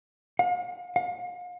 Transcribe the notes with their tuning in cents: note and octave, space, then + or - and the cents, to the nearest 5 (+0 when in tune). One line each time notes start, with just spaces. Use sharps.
F5 +40
F5 +40